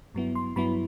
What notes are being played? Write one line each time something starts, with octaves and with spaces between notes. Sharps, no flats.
G2 F#3 B3 E4
C6
G2 F#3 B3 E4 B5